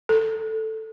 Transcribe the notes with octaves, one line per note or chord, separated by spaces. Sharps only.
A4